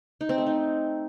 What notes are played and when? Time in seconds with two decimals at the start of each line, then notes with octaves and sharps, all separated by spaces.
0.21 D#4
0.29 C4
0.38 A3
0.46 D#4